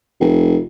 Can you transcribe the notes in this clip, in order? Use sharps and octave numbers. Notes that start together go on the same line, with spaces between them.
F1